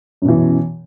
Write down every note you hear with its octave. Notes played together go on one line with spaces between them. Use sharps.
F#2 B2 E3